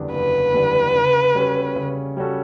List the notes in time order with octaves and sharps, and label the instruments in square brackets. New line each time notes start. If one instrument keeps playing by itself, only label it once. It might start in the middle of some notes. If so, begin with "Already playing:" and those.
Already playing: [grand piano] F#1 E2 D3 G3 D4
[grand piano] F#1 [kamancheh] B4
[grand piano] E2 D3 G3 D4
C#3
G3 C#4 F#4 A4
C#3
G3 C#4 F#4 A4